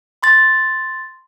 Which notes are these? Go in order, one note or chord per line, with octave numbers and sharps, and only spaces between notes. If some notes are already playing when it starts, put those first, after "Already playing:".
B5 C6 A6